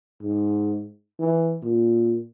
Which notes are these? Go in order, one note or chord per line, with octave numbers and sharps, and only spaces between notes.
G#2
E3
A#2